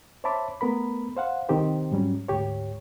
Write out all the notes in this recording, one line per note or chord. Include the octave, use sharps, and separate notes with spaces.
C5 C#5 E5 A5 B5 D6
A3 B3 A#4 B5
C5 F5 F#5
C2 D#3 C4 G4 C5
G#2 F#3 G3 C#4
D2 G#2 G4 C#5